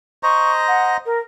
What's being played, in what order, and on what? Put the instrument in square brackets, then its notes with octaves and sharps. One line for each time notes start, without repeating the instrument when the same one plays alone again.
[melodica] C5 D#5 A#5 [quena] C#6
[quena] F#5
A#4